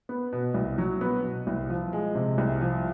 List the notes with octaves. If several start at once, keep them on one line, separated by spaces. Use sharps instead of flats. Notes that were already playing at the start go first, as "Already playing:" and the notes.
B3
B2
C2
F#3
B3
B2
C2
F3
G#3
C3
C2
F3